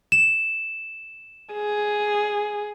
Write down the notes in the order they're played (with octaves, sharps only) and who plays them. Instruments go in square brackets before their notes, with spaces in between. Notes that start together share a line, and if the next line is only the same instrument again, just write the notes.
[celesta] E7
[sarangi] G#4